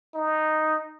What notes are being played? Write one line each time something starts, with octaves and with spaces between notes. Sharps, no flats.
D#4